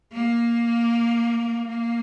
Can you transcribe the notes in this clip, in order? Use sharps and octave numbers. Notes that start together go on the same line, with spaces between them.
A#3
A#3